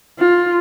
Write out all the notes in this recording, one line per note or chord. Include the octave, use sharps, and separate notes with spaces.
F4